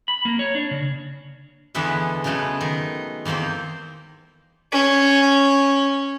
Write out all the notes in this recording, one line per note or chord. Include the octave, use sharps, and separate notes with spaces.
B5
A#3
C#5
D4
C#3
E2 D3 E3 G#3 B3 E5
C#3 F#3 G#3 A3 B3
D#3
E2 D#3 A#3 C4 C5
C#4